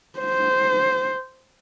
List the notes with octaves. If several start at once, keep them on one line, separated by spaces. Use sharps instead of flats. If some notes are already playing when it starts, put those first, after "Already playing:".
C5